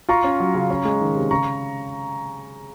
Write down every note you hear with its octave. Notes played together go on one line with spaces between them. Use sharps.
F4 A#5 C#6
C#4
F#3
C#3
C#4
G#3
D#3
C3
C#3 A#5 C#6